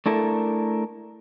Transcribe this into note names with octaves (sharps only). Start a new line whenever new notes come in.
A3 D4 E4 A4 A#4